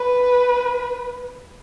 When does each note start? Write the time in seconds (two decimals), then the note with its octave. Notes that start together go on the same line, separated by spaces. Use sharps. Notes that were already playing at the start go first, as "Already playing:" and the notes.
Already playing: B4